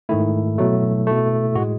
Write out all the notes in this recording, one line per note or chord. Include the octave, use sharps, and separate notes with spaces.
G#2 D#3 A3 E4
B2 F#3 A3
B2 A3
A2 G#3 F#4